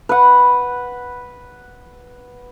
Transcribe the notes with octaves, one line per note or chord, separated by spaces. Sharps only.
B4 F#5